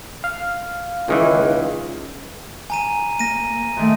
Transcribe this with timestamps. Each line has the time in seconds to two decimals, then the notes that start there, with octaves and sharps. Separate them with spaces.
0.24 F5
1.08 C#2 A#2 D#3 E3
2.70 G#5 A#5 D#7
3.19 A#3 A#6 D#7
3.77 A#2 D#3 A3